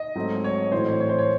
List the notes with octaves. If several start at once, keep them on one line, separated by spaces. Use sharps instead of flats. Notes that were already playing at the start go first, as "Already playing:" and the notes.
Already playing: D#5
G#2 F#3 A3 C4
C#5
A2 E3 A3 C4 C5
C#5
C#5
C5
C#5